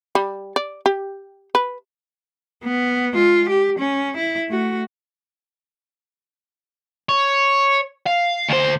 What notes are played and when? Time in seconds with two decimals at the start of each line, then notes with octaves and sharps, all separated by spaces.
0.15 G3
0.56 D5
0.86 G4
1.55 B4
2.64 B3
3.14 G#3 F4
3.49 G4
3.79 C#4
4.17 E4
4.49 A3 F#4
7.09 C#5
8.06 F5
8.49 D2 C5